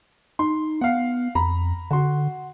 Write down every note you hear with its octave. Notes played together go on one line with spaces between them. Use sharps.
D#4 C6
B3 F5 F#5
F2 A#5 B5
D3 F#4 C6